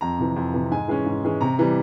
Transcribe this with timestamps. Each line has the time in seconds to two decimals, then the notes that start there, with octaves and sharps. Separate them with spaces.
0.01 F2 A#5
0.19 C3 E3
0.36 F2
0.54 C3 E3
0.71 G#2 G#5
0.88 E3 G#3 C#4
1.06 G#2
1.24 E3 G#3 C#4
1.41 C3 A#5
1.59 E3 G3